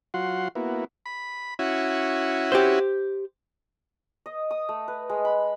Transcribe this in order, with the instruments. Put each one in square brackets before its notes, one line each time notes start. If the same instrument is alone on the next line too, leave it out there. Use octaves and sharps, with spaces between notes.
[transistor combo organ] F#3 F4 F#4 F#5 C6
A#3 B3 E4 F#4
B5
C#4 E4 F#4
[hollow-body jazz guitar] G4 C5
[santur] D#5
D#6
A3
B4
G#3
B5